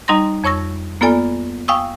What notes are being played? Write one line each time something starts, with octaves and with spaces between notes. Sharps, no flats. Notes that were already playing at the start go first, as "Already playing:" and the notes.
G3 D#4 D#5 A#5 C6 A#6
F2 C#5 C#6 E6 A#6
A#3 B3 F4 A4 D5 G#5
F5 G5 G#5 C#6 D#6 E6